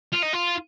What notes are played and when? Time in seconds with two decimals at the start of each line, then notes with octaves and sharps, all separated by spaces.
0.13 F4
0.23 D#4
0.34 F4